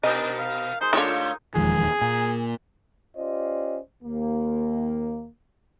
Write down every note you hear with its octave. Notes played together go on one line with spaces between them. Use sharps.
B2 D4 D#4 A#4 D#5
F5
G#3 D#4 C5
D3 D#3 A3 F4 G4 C#5
D#1 E2 D#3 F3 G#3 G#4
A#2 G#5
C#4 F4 G4 C5 D5 D#5
D#2 A#3